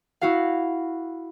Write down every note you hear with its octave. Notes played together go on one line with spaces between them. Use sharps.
E4 F#4 F5